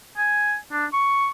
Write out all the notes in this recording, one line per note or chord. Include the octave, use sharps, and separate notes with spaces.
G#5
D4
C#6